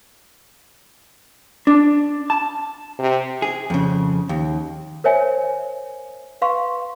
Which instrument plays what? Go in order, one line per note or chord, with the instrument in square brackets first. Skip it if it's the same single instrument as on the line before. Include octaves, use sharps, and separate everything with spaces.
[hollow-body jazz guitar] D4
A5
[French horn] C3
[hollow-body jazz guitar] G#4
F2 C#3
D#2
[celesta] A#4 C5 C#5 E5 G#5
B4 F5 C6 C#6